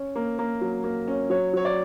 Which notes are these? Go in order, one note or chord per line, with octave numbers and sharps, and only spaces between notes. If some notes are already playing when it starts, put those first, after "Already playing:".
Already playing: C#4
A#3
A#3
F#3
A#3
C#4
F#3 C#5
F#3 C#5
D5